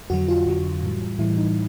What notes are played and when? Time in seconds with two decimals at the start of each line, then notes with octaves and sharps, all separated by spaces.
0.10 F2 D3 F#3 F#4
0.28 F4
0.46 F2 D3 F#3
0.82 A2 E3 G3
1.19 A2 E3 G3 E4
1.37 D#4